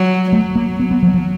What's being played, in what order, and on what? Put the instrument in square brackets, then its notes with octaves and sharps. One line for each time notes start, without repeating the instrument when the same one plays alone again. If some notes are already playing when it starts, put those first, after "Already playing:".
Already playing: [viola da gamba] F#3
[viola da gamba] F#3 [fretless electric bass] A3
[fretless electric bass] A#3
B3
B3
F3
F3